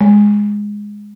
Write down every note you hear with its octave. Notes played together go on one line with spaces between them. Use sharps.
G#3